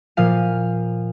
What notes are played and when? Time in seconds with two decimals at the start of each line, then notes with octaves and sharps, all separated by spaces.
0.17 A#2 F3 F5 D#7